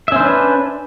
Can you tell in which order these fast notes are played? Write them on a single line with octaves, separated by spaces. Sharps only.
E5 C#4 C5 D4 B4